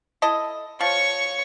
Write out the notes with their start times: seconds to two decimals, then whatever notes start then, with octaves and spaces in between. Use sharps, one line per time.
0.22 E4 A4 D#5
0.81 F3 C#5 C#6